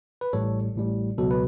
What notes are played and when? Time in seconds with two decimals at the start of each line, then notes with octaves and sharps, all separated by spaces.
0.21 B4
0.33 A1 A2 G3 A4 C#5
0.75 A1 A2 G3
1.18 C#2 B2 F#3 A4
1.31 B4